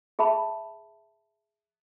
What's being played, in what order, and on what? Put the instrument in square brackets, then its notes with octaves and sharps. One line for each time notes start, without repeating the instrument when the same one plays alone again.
[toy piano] G#4 E5 A5 B5